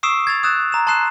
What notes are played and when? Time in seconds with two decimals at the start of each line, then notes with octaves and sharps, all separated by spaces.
0.03 C#6 D#6 E6 C7 D7 E7
0.27 G#6 A6 F7
0.43 D#6 E6 F#6 A6 E7
0.72 A#5 E7
0.87 A5 C6 D#6 F#6 C7 E7